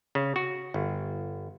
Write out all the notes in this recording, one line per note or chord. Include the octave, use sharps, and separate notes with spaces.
C#3
F#4
G1